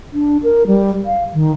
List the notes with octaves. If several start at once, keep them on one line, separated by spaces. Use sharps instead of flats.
D4
A#4
G3
F5
D#3